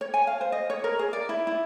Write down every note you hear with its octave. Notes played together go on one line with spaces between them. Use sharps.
C#5
G#5
F5
C5
D#5
C#5
A#4
G#4
D5
E4
E4